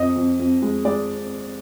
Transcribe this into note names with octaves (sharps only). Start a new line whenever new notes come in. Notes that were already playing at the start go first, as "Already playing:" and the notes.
Already playing: F2 D#5
F2
F2
G#3
G#3 D5